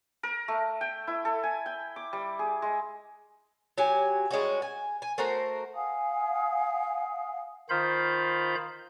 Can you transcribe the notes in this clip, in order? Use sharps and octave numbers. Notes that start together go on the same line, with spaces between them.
A#4
A3
G5
E4
A4
G#5
G5
D6
G3
G#4
G#3
F#3 G4 G#5
G3 G#3 C#4 F#4
G#5
G#5
A3 F#4 A#4 C5
F5 F#5 G#5 D#6
D#3 F4 C5 F5 B5 G6